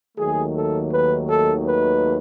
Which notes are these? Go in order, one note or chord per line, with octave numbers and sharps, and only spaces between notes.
D#2 D#3 F#3 A3 G#4
A4
B4
A4
B4